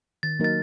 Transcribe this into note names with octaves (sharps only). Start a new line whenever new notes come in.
D#3 A6
F#3 A#3 D#4 A#4 A6